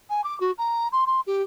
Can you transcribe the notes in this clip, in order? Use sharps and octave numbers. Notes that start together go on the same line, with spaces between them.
G#5
D6
F#4
A#5
C6
C6
G4